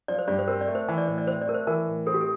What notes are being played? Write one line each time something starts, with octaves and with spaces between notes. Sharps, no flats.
F3 D5
C5
G2 D5
C5
C4 A#4
D5
A3
C5
E3 C5
D5
A2 C5
D5
C4 C5
D5
A3 A#4
C5
E3 A#4
A2
C4 A4
G4
A4